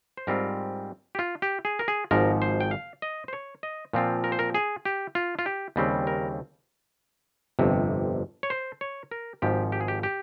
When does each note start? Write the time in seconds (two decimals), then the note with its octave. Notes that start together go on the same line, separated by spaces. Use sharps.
0.17 C5
0.27 G#2 G3 C4 F4 A#4
1.15 G4
1.19 F4
1.42 G4
1.65 G#4
1.79 A#4
1.88 G#4
2.11 G#1 G#2 F3 A#4
2.42 C5
2.60 G5
2.71 F5
3.02 D#5
3.28 C5
3.33 C#5
3.63 D#5
3.93 A#2 F3 C4 F4
4.24 A#4
4.32 C5
4.39 A#4
4.55 G#4
4.85 G4
5.15 F4
5.39 F4
5.46 G4
5.76 D#2 C#3 G3 C4
6.07 A#4
7.59 G1 F2 C3
8.43 C#5
8.50 C5
8.81 C#5
9.11 A#4
9.42 G#1 G#2 F3 G4
9.72 G4
9.81 G#4
9.88 G4
10.03 G4